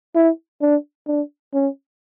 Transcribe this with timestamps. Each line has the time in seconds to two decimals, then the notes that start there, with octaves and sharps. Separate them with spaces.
0.15 E4
0.61 D4
1.07 D4
1.54 C#4